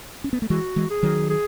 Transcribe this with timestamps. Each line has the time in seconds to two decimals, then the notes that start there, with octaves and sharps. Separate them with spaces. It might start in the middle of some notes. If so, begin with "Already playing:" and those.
0.24 C#4
0.33 B3
0.42 A3
0.50 E3 G#3 F#4
0.76 E3 G#3
0.90 G#4
1.03 D#3 F#3
1.30 G#4